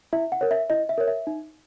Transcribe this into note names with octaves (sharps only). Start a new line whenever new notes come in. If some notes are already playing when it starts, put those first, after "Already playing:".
E4 E5
F#5
A#4 C#5
E5
E4 D#5
E5
A#4 C#5
E5
D#4